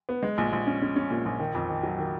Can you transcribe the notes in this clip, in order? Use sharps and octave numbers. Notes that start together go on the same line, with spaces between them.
B3
G#3
A#1
A#1
C#4
C#4
C#4
A#2
A#1
D#3
F2
D#3
F#3
D#3